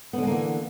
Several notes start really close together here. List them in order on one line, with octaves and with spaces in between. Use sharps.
B3 D3 G#3 A#3 E3